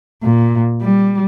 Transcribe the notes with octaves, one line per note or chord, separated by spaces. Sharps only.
A#2
G3